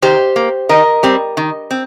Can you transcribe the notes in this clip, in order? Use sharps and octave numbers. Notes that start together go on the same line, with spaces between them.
D#3 G4 C5
A#3
D#3 A#4 D#5
G3 C4
D#3
C4